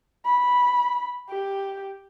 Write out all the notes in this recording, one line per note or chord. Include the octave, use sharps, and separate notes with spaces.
B5
G4